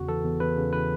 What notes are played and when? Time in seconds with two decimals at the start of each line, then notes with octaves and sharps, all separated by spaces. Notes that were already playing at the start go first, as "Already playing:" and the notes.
Already playing: E2 C#3 F#4
0.09 E3 A4
0.25 E2
0.40 E2 B4
0.57 C#3
0.73 E3 B4